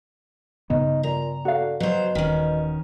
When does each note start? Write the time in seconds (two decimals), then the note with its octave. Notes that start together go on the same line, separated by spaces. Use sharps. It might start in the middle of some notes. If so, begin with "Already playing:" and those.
0.70 G2 C#3 B3 D#4
1.03 A#2 A#5
1.45 D3 F#4 F5
1.80 B2 F#3 C5
2.15 D#1 D#3 C#4